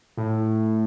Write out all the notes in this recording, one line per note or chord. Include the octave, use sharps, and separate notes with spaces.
A2